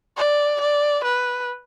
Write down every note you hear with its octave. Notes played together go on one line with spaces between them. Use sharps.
D5
D5
B4